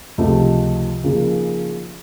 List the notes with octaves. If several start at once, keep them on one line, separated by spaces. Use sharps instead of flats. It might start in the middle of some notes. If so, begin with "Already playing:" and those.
C#2 C3 F3 A3
C#3 F3 A#3 D#4 G#4